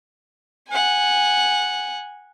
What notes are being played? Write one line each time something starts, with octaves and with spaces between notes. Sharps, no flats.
F#5 G#5